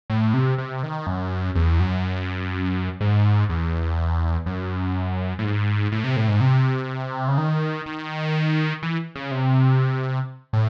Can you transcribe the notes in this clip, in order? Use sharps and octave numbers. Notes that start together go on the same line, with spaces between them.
A2
C3
C3
D#3
F#2
E2
F#2
G#2
E2
F#2
A2
G#2
A2
C3
A2
G#2
C3
C#3
D#3
D#3
E3
C#3
C3
A2